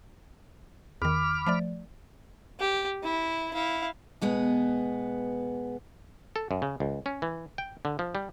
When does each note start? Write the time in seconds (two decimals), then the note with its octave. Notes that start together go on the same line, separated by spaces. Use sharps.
1.02 E2 D#3 B5 D6 F6
1.47 F3 A3 D5
2.60 G4
3.03 E4
3.54 E4 F5
4.22 B2 G#3 B3
6.36 A4
6.51 F#2
6.62 C#3
6.80 C#2
7.06 C#4
7.22 E3
7.58 G5
7.85 D3
7.99 F3
8.15 G3